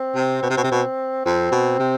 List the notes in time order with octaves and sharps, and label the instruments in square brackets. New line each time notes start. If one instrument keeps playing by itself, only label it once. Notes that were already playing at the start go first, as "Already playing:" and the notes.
Already playing: [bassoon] C4
[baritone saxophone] C3
B2
C3
B2
C3
B2
[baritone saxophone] F2 [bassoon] C4
[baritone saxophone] B2
C3